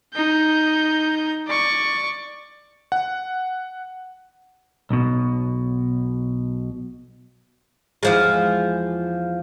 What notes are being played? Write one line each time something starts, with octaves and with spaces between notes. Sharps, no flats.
D#4 G6
D5 C#6
F#5
B1 B2
E2 F3 G#3